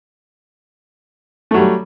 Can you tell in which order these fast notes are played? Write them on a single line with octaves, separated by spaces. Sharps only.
A3 F#3 G3